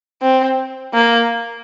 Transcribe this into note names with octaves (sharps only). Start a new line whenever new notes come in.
C4
A#3